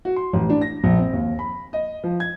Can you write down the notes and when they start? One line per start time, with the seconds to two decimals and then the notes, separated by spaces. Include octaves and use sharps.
0.05 F#4
0.16 C6
0.33 A1
0.50 D4
0.61 A#6
0.84 A#1
0.98 C4
1.13 D#2
1.39 B5
1.73 D#5
2.04 F3
2.20 G#6